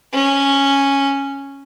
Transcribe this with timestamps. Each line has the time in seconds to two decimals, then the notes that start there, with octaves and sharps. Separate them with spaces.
0.13 C#4